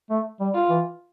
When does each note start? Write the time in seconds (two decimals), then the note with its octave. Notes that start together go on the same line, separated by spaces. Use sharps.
0.10 A3
0.40 G3
0.54 F4
0.70 E3